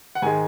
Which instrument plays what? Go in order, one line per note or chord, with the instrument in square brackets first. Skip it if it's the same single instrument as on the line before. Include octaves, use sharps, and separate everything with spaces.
[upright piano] F#5
G#2 D#3 G#3 G#5